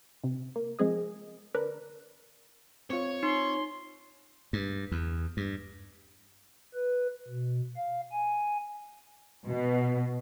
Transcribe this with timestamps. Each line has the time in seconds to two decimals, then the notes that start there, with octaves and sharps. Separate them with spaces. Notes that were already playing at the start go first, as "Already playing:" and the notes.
0.24 C3
0.56 A#3
0.79 F3 G#3 C4 G#4 D#5
1.54 D3 D4 A#4 B4
2.90 C4 F4 C#5
3.23 D#4 C6
4.53 G2
4.92 E2
5.37 G2
6.74 B4
7.28 B2
7.76 F5
8.12 G#5
9.46 B2